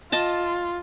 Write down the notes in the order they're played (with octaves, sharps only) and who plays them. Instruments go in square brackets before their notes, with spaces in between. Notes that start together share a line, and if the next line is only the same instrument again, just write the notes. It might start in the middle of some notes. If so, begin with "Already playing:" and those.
[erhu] F4 [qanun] D#5 A5